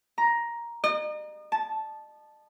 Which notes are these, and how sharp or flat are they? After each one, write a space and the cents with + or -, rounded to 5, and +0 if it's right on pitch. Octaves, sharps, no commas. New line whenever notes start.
A#5 +10
D#5 -40
A5 -10